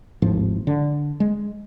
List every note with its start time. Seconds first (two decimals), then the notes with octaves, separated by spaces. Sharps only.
0.22 G#1 D#2 A2 F3
0.67 D3
1.20 G#3